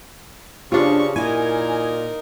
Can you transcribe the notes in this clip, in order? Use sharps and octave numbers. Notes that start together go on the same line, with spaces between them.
C#3 D4 F4 G4 C5 C#6
A#2 D#4 E4 A#4 G#5